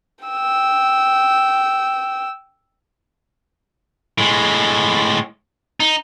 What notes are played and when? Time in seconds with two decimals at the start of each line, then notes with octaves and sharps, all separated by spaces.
0.25 G5 E6
4.18 A2 G#3
5.80 D#4